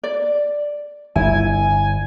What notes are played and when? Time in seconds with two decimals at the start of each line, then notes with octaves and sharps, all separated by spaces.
0.04 D5
1.16 G1 E4 G#5